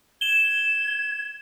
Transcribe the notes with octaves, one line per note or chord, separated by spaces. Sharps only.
G#6 E7 G7